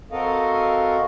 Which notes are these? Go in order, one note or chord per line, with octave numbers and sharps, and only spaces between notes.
C4 F#4 A4 A#4 D#5 F5